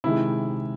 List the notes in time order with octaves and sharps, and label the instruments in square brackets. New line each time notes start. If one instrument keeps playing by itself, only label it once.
[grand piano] C3 D#3 G#3 E4